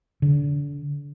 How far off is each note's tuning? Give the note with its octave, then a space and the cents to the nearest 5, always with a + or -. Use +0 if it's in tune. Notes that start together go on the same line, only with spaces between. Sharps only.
D3 -35